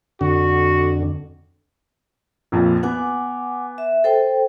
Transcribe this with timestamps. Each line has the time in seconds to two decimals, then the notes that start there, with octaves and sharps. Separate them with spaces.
0.21 F2 D3 F#4
2.52 A#1 F2 A#2
2.83 B3 F#5 G#5 D6
3.78 E5
4.04 A4 C5 G5